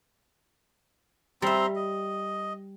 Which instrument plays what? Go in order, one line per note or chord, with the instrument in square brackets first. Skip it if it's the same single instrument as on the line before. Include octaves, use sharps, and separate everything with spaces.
[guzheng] G3 E5 [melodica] C4 A#5 C6
[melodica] D#5